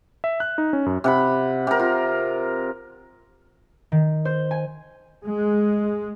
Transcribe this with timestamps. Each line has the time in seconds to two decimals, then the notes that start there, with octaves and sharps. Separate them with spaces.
0.24 E5
0.40 F#6
0.58 D#4
0.73 C#4
0.86 F#2
1.04 C3 F#5 B5
1.67 C3 A#4
1.79 F4
3.92 D#3
4.25 C5
4.51 G#5
5.26 G#3